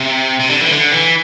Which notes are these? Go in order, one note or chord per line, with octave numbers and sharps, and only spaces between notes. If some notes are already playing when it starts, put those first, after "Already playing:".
Already playing: C3
C3
D3
E3
D3
E3